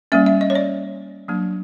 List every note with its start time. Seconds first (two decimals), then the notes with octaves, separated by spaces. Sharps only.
0.12 G3 A#3 C#4 E5
0.26 E5
0.41 D#5
0.50 C#5
0.55 D5
1.28 F#3 A#3 D4